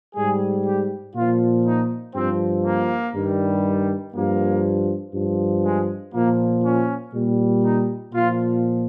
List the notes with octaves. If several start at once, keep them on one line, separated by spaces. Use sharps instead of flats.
G#2 G3 G#4
G4
A#2 F3 F4
D#4
G2 F3 C4
A#3
G2 D#3 G3
G2 F3 A#3
G2 F3
G#3
A#2 F3 A#3
C#4
A#2 G3
D#4
A#2 F3 F4